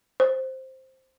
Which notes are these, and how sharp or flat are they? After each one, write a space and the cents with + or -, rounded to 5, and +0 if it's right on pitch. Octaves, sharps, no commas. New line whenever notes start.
C5 +5